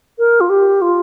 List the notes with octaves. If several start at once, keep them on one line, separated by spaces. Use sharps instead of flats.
A#4
F4
G4
F4